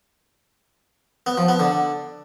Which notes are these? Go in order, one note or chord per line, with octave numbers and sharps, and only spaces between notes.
B3
F3
B3
D3